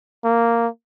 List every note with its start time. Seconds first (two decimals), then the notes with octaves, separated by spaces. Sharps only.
0.24 A#3